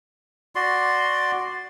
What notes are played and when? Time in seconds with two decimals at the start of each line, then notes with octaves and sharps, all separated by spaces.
0.55 F#4 D5 C6